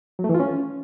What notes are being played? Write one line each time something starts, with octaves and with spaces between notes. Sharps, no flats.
F#3
A3
E3
F4
C#4